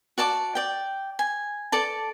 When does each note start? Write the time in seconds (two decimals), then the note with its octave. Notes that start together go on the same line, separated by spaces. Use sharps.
0.18 F#4 D5 A5 D6
0.55 D5 G5
1.19 G#5
1.72 A4 D5 A5